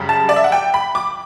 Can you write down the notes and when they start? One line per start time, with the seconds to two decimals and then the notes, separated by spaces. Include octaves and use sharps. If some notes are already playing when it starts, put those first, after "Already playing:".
Already playing: F#2 C#3 G3
0.09 A5
0.29 D5
0.36 E5
0.44 F#5
0.52 G5
0.74 B5
0.95 D6